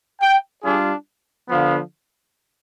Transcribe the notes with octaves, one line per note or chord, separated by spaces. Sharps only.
G5
G3 D4 F4 G#4
D3 F3 B3 F5